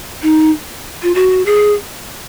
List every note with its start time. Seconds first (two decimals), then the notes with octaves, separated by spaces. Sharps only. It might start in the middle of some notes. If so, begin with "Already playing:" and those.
0.22 D#4
1.03 F4
1.15 F#4
1.46 G#4